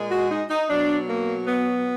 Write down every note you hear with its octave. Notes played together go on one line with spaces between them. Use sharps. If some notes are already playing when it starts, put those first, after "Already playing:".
Already playing: A#2 G#3
F#4
D#4
D#4
B2 F#3 D4
A#3
B3